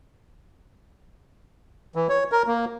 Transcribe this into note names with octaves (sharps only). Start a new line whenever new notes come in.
E3
C#5
A#4
A#3